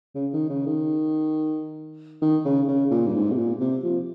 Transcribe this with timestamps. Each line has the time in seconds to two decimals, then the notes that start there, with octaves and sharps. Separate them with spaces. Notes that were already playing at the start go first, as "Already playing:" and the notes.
0.15 C#3
0.33 D#3
0.50 C#3
0.66 D#3
2.22 D#3
2.45 C#3
2.68 C#3
2.91 A#2
3.07 G2
3.14 G#2
3.32 C3
3.38 A#2
3.60 C3
3.83 F3